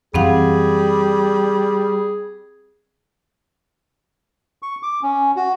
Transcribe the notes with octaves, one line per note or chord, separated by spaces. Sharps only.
F#2 E3 G3 C4 G#4 F5 F#5
C#6
D6
C#4
F#4